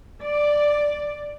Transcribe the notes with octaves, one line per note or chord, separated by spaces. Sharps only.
D5